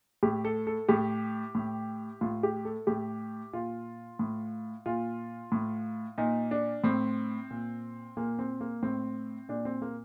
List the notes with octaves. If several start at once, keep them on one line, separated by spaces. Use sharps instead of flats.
A2 G4
A4
A4
A2 G4
A2
A2 F4
G4
A4
A2 G4
A#2 F4
A2
A#2 F4
A2
A#2 D#4
D4
A2 C4
A#2
A#2 A#3
C4
A#3
A2 C4
A#2 D4
C4
A#3